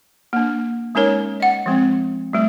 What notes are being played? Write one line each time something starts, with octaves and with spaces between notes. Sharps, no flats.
A#3 D4
G#3 C#4 D#4 A#4 C#5
D#5 F#5
F3 G#3 C4
G3 A3